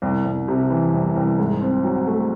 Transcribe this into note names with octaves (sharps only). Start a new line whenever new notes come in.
C2
C2
C3
E3
C2
C2
G#2
C4
F#3
A3